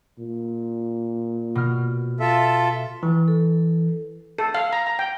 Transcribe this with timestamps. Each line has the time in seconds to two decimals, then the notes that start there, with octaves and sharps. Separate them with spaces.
0.19 A#2
1.55 B2 F6
2.20 F4 A4 E5
3.03 E3
3.28 A4
4.38 A4
4.55 F5
4.73 A#5
4.87 A#5
4.99 G5